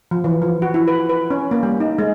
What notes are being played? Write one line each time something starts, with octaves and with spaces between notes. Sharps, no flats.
F3
E3
F3
F#4
E4
B4
B4
C#4
A#3
G3
D#4
G#3